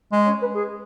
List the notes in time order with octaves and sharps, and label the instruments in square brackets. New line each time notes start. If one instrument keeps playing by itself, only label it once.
[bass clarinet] G#3
[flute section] C#4 C#5
B4
G#4